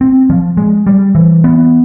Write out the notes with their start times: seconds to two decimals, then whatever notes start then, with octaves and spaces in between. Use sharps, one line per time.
0.01 C4
0.30 F3
0.57 G#3
0.87 G3
1.15 E3
1.44 B3